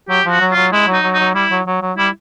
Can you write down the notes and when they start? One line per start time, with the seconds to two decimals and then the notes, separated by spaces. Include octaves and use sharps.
0.09 F#3 G4
0.25 F3 F#4
0.40 F#3
0.52 F#3 F4
0.72 G#3 E4
0.87 F#3
0.93 D#4
1.04 F#3
1.13 D#4
1.20 F#3
1.34 G3 E4
1.51 F#3
1.67 F#3
1.82 F#3
1.98 G3 E4